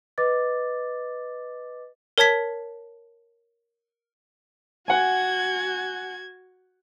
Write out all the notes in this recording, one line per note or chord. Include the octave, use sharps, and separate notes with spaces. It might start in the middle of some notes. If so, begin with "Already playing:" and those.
B4 D#5 D6 A6
A#4 C#5 A5 G#6 B6
F#4 F#5 G#5 G#6